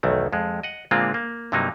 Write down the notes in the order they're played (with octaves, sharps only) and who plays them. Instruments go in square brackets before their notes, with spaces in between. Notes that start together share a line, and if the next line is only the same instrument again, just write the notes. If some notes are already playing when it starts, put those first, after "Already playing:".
[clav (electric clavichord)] B1 E2 D#3 A3
F2 G#3
D#5 F#5
A#2 D3 G#3 A#3 C4 F4
A#3
G2 C3 F#3 A#3 D#4